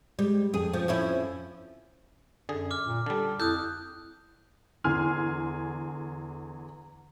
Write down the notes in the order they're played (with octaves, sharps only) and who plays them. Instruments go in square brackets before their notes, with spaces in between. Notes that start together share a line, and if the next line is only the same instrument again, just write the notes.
[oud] G3 [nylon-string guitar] G#3
[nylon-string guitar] F2 [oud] G#4
[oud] F3
F3 C#4 E4
[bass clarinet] F#2 [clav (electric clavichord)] D3 G#4
[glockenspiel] D6 F6
[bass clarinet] A#2
[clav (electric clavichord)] D3 G3 [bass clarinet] A4
[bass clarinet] F2 [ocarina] E4 [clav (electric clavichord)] A4 [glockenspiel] D#6 F#6 G6
[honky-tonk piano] E2 D3 G#5 C6 F6